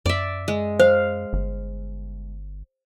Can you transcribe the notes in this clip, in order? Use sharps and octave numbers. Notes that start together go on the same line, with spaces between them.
F#2 D5 E5
G#3
C5 F5
G1